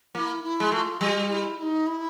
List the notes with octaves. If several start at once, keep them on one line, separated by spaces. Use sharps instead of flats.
A#3 E4 F4
E4
G#3
A3 F#4
F4
G3 F#4
E4
E4
D#4
E4